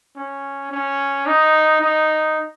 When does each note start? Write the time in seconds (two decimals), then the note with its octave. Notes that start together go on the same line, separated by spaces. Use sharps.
0.17 C#4
0.71 C#4
1.26 D#4
1.81 D#4